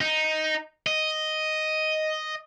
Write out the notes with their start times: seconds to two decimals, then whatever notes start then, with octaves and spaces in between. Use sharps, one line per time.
0.01 D#4
0.87 D#5